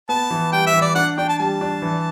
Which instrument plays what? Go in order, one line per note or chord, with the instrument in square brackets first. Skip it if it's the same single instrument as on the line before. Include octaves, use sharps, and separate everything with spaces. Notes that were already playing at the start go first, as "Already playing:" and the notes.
[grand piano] B3 [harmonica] A5
[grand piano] E3
[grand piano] G3 [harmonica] G5
[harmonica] E5
[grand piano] E3
[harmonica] D5
[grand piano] D4 [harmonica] F#5
[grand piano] D4 [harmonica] G5
[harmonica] A5
[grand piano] G3 [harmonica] A5
[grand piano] D4
E3